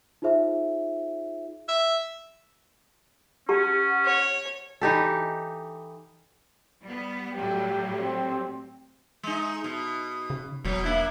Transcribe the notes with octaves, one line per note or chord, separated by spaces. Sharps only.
D#4 F4 G#4 C5 E5
E5
C#4 G4 F#5 A5 C#6
C#5
E3 D#4 G4 A4
G3 B3
A2 F#3 G3 G4
C4 G4
G#3 D#4
B2
C#3
E1 B2 F#3
A#3 D4 E4